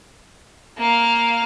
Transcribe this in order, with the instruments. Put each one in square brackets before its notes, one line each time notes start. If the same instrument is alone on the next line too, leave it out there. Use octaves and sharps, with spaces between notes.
[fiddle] A#3 F5